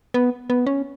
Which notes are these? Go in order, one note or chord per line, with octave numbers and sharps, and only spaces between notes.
B3
B3
C#4